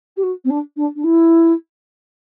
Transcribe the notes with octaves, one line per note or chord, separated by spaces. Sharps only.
G4
F#4
C4
D4
D4
D4
E4